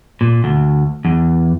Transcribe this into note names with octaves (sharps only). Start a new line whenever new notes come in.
A#2
D2
E2